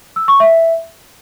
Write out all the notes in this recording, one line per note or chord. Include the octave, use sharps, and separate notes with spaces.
E6
C#6
E5